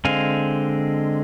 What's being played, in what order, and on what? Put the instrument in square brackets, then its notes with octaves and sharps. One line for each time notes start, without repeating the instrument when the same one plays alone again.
[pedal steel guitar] D3 G#3 C4 F5 G#5